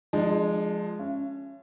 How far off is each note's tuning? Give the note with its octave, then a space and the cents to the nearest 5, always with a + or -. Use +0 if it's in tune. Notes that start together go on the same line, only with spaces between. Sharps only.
F3 +0 G#3 +0 D4 +40
C#4 +0 E5 +45